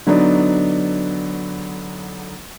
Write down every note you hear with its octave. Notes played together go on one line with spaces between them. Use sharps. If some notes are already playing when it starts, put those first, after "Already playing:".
D3 F#3 B3 D4 D#4